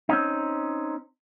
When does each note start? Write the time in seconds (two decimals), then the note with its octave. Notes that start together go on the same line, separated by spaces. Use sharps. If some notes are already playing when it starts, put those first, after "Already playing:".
0.09 C4 C#4 D#4